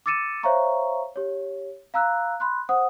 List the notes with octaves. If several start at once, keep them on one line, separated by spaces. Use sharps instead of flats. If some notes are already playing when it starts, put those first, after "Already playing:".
D6 E6 A6 C#7 D#7 E7
C5 C#5 E5 F5 A#5 C#6
G4 C#5
F5 A#5 E6 F#6
B5 C6 F#6
C5 F#5 D#6